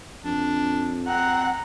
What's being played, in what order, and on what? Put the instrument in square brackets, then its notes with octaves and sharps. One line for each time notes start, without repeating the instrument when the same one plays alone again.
[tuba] F2 [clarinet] D4
[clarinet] C4 [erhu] F#5 [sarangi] A#5